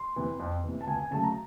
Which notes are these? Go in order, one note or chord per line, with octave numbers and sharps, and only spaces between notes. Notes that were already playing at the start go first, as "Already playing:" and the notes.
Already playing: C6
C3 E3
F2
C3 E3
A5
C#2 G#5
G#5
C#3 F#3 A3 A5
A#5